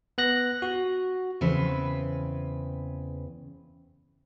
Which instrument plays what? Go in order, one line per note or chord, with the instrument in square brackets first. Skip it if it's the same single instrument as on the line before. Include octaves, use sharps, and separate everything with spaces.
[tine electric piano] B3 F#6 A#6
F#4
[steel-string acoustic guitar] E2 C#3 C4 B4